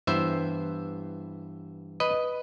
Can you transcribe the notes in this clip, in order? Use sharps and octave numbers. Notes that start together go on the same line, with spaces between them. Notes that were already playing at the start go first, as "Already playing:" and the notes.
G2 E3 B3 C5 E5
B4 D#5